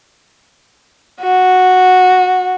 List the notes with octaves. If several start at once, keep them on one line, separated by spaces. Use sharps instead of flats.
F#4